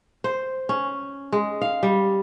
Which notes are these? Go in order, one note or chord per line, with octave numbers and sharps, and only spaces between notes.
C5
C#4
G#3
F5
G3